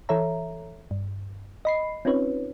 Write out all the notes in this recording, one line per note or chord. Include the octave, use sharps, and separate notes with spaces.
E3 A4 C#5 E5 A#5
G2
D#5 B5 C7
C4 C#4 D#4 F4 B4 C#5